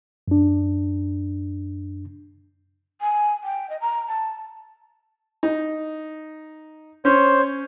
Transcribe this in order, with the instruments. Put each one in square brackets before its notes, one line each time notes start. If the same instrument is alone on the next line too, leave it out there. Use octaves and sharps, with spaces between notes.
[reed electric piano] F#2 D4
[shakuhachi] G#5
G5
D#5
A#5
A5
[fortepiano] D#4
[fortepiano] C#4 [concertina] C5 C#5